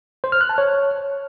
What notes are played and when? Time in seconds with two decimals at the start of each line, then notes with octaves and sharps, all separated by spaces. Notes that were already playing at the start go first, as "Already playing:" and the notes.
0.24 C5
0.32 F6
0.41 F#6
0.49 A5
0.58 C#5